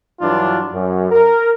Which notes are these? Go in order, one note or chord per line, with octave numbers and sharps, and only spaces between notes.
G2 E3 F#3 D4 F4
F#2
A#4